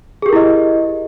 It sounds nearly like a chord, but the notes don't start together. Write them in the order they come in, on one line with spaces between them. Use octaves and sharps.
G#4 G4 A#4 E4 D#5